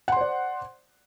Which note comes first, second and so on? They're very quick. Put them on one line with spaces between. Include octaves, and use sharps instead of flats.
F#5 C6 C5 D5